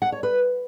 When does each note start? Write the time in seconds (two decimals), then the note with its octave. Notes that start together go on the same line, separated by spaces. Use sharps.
0.02 F#5
0.12 C#5
0.23 B4